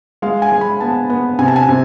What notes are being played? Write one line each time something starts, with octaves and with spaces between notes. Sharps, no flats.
G#3 F5
G#5
G#3
B5
B3 A5
B3
C3 G#5
A5
G#5
C3